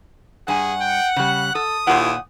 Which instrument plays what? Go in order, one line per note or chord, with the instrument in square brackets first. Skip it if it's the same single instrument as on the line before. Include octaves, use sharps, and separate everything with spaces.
[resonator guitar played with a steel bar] G2 G#5 [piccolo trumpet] G#4 [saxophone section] F#5
[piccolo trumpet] G5
[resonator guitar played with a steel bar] C#3 G3 [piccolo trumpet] F#6
[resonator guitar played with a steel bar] A4 [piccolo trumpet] D#6
[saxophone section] D#2 E4 F4 [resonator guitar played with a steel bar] A#2 F#5